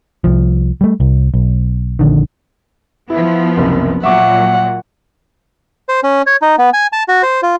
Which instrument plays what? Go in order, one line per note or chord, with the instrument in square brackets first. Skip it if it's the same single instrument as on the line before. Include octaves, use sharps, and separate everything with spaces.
[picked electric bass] C2 F3
G3 A3
C2
B1
A#1 D3 D#3
[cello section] F3 B3 [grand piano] E4
[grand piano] F#1 C2
[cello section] A#2 F#3 [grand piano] E5 C#6 D6 [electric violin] F#5
[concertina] C5
C#4
C#5
D#4
B3
G#5
A5
F#4
C5
F4